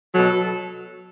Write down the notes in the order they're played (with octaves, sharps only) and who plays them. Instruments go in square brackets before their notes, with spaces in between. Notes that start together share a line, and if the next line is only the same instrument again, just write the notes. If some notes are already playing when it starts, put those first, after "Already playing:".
[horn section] B2 F#3 A4